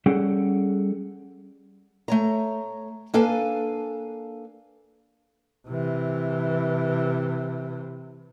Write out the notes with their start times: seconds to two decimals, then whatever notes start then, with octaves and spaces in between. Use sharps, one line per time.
0.06 G3 C#4 G#4 A4 F#5 G5
2.08 A3 C#5 A#5
3.14 A#3 D4 A4 B4 F5 G#5
5.67 C3 E3